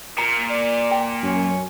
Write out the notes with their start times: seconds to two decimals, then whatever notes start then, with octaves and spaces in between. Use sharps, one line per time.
0.18 A#2 A#5
0.50 D5
0.91 G5
1.23 F#2 C#4